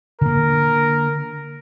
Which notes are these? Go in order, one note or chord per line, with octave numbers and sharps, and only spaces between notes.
D3 A#3 A#4